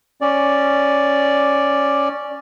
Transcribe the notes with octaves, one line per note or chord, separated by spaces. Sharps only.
C#4 D5